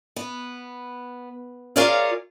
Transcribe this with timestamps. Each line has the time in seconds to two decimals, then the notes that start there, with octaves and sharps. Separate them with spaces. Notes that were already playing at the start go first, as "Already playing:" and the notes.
0.16 B3
1.76 F4 G#4 A#4 C#5 D5 F5